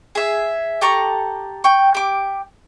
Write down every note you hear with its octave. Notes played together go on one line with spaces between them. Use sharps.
G#4 E5
G4 A4 A#5 C#6
G5 C#6
G4 D6